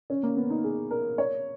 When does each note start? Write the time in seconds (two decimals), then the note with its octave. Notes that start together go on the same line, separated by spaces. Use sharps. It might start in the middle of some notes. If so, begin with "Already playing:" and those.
0.10 C#4
0.23 A#3
0.37 B3
0.50 D#4
0.64 G#4
0.91 A#4
1.18 C#5